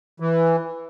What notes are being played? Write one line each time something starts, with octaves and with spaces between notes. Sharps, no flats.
E3